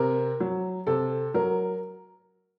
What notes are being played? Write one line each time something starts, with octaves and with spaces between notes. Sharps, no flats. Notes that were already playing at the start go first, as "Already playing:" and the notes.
Already playing: C3 A#4
F#3
C3 A4
F#3 A#4